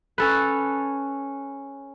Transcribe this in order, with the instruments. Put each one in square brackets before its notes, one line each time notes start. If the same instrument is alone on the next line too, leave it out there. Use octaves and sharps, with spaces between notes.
[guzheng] C#4 A4 B4